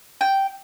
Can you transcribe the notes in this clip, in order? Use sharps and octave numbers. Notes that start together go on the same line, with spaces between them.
G5